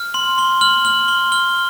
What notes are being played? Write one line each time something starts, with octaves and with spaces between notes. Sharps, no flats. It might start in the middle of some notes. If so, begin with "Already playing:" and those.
Already playing: F6
C6 F#7
C6 G7
F6 F#7
F6 F#7
C6 G7
F6 G7